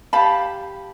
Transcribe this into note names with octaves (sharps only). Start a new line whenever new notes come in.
G4 F5 A5 B5